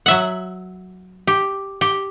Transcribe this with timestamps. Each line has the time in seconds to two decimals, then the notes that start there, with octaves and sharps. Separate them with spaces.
0.06 F#3 E5 F#5
1.27 G4
1.81 G4